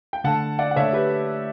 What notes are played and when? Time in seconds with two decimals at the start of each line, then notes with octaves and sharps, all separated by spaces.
0.13 G5
0.24 D3 A3 F#5 A5
0.59 D5 F#5
0.71 F#5
0.76 D3 A3 C#5 E5
0.93 G4 B4